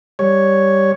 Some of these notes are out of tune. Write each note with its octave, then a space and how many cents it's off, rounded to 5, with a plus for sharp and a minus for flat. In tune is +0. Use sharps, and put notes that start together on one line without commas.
G3 +0 C#5 +0